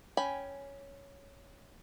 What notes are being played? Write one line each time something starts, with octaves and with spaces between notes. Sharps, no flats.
C#4 G5 G#5 B5